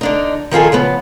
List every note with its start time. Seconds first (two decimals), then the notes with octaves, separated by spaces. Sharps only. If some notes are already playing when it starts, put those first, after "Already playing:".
0.01 D3 D4 D#4
0.51 D#3 F3 F4 G#4 A4
0.72 C#3 F3 B3